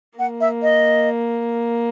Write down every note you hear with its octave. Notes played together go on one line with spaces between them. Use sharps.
A#3 F#5
E5
D#5